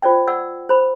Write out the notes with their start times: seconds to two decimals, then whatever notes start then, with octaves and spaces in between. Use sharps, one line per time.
0.02 F4 C5 D5 G5
0.27 D5 F#5 E6
0.69 C5 B5